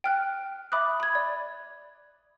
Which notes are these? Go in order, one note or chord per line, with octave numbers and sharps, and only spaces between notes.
G5 F6 F#6
E5 B5 D6 D#6 F#6
B5 G#6
D5